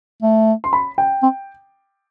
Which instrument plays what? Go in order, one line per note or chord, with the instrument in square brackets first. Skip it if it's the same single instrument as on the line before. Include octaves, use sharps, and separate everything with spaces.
[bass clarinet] A3
[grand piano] C6
B5
G5
[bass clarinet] C4